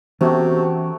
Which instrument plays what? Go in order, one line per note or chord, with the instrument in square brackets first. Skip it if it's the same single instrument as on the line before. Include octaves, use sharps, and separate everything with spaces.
[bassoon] C3 [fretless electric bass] E3 B3 C#4 [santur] F#3 A3 G4